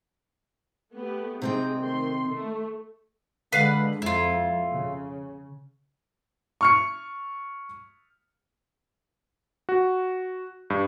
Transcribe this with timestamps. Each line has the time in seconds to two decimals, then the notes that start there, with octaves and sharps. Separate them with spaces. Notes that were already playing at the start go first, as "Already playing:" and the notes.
0.93 A3 B3 G4
1.42 C3 G#3 C4 D#4 G5
1.80 D#3 A3 C6
2.28 A3
3.53 D3 G#3 B4 F5 F#5
4.02 F2 E4 F4
4.71 C#3
6.61 C#6 F6 C#7
9.69 F#4
10.70 G2